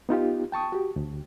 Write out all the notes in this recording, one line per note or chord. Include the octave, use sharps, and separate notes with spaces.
B3 D#4 F4 G4
G5 A5 C#6 D#6
F#4 G4
D2